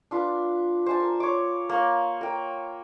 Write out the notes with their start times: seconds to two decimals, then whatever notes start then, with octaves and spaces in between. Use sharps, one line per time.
0.11 D4 F4 B4
0.86 C5 G#5 A5
1.00 A#4
1.20 C#5 D6
1.69 A#3 C#5
2.21 A#4 G5